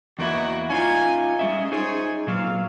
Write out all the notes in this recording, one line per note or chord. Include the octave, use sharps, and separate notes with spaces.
E2 A#3 D#4 E4 F#4
C#4 D#4 F4 G#5
G3 G#3 C#4 G#4 E5
D#4 G#4 C5 C#5 G#5
A#2 F#3 F5